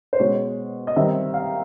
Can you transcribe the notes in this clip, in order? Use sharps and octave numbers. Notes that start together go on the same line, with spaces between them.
C5
B2 G#3 C#4 C#5
D#5
D#3 G3 C4 D#4 E5
F5